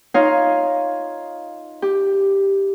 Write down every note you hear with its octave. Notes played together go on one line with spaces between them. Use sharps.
D#4 F4 C#5 D#5 F5
G4